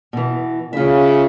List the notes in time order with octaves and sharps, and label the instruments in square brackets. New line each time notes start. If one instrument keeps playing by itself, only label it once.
[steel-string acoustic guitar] B2 E3
[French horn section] C#3 [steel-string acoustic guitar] F4 E5